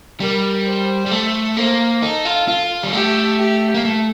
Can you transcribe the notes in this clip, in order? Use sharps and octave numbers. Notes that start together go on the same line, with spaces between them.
G3 A#4
C5
G3
A3
A#3 C5
D#4 A4
F4
F4
G3
A3 G4
G4
A#3
A3